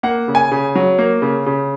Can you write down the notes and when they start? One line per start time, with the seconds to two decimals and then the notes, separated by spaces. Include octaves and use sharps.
0.03 A#3 F#5
0.28 C#3
0.35 G#5
0.52 C#3
0.75 F#3
0.98 A#3
1.22 C#3
1.46 C#3